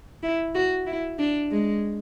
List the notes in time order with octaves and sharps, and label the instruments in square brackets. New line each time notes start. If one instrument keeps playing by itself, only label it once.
[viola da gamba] E4
F#4
E4
D4
G#3